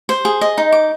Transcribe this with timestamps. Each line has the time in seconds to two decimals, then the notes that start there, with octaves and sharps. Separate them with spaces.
0.09 C5
0.25 G#4
0.41 D#5
0.58 D#4
0.72 D6